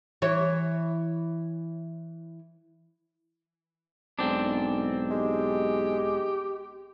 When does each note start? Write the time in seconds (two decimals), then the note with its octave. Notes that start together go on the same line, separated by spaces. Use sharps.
0.22 E3 C#5
4.19 B1 G#2 C4 D4
5.10 G#3 G4